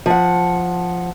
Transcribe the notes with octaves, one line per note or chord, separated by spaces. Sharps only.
F3 F#5